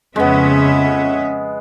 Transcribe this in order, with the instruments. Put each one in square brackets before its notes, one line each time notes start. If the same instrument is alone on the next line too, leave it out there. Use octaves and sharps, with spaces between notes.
[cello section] F2 C#4 E5 [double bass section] C#3 [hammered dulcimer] G#3 B3